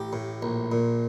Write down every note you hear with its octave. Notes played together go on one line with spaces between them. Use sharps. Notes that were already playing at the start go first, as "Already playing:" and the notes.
Already playing: A1 G4
A2
A#1
A#2